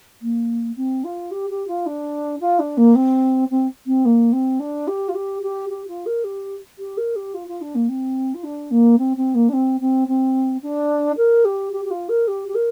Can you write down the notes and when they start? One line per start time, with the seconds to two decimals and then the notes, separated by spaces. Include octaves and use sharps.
0.21 A#3
0.76 C4
1.04 F4
1.31 G4
1.49 G4
1.67 F4
1.86 D4
2.40 F4
2.59 D4
2.77 A#3
2.95 C4
3.50 C4
3.86 C4
4.05 A#3
4.32 C4
4.59 D4
4.87 G4
5.08 F4
5.14 G4
5.42 G4
5.69 G4
5.87 F4
6.06 A#4
6.24 G4
6.78 G4
6.97 A#4
7.15 G4
7.34 F4
7.47 F4
7.61 D4
7.75 A#3
7.88 C4
8.34 F4
8.43 D4
8.70 A#3
8.98 C4
9.17 C4
9.34 A#3
9.49 D4
9.53 C4
9.80 C4
10.08 C4
10.62 D4
11.17 A#4
11.44 G4
11.72 G4
11.84 G4
11.90 F4
12.08 A#4
12.27 G4
12.48 G4
12.54 A#4